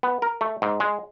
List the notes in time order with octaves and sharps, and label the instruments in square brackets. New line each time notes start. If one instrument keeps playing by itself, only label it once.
[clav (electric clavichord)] B3
A#4
A3
G#2
G#3